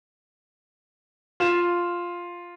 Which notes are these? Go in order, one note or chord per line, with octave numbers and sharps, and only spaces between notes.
F4 E7